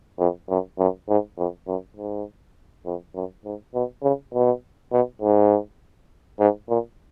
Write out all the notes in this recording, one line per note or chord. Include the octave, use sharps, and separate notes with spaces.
F2
F#2
F#2
G#2
F2
F#2
G#2
F2
F#2
G#2
B2
C#3
B2
B2
G#2
G#2
A#2